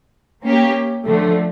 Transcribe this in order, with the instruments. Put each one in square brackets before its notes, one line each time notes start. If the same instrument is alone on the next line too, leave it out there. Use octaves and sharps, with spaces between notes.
[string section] A#3 C#4 G4
D3 F3 A3